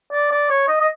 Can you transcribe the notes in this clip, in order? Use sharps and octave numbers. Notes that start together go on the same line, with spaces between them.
D5
D5
C#5
D#5
D#5